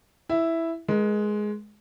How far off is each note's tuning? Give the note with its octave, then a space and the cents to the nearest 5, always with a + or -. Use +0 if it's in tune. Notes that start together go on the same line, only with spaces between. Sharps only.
E4 +0 E5 +0
G#3 +10 A#4 +40